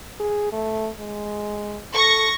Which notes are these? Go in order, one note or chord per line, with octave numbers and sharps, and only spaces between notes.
G#4
A3
G#3
A4 C#6 A#6